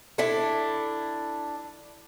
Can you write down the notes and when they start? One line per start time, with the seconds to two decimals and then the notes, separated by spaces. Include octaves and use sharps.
0.18 D4 E4 A4